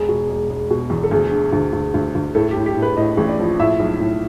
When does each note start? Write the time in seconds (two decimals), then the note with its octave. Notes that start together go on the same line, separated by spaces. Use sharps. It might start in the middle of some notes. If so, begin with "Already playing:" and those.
Already playing: E1 G#4
0.09 B2
0.29 E1
0.49 E1
0.71 B2
0.90 E2
1.03 A4
1.11 D2 G#4
1.31 D3
1.52 D2
1.73 D2
1.94 D2
2.15 D2
2.35 A2 A4
2.51 G4
2.56 A2
2.66 G4
2.77 A2
2.82 B4
2.97 A2 D#5
3.17 A1
3.29 D5
3.39 F3
3.60 A2 E5
3.80 B1
4.00 A2